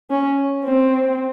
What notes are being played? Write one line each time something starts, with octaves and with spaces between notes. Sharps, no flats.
C#4
C4